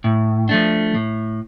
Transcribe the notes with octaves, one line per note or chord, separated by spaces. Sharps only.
A2
F3 A3 D4
A2